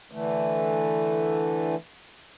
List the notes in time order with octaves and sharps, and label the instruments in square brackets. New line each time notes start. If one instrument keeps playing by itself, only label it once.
[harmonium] D3 E3 A3